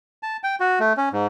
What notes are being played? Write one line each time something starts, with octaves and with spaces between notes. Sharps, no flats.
A5
G5
F#4
A3
C#4
G#2